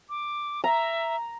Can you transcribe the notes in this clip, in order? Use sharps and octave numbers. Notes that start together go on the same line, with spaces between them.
D6
E5 A#5